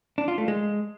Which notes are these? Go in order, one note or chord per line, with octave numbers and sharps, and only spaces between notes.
D4
F4
A3
G#3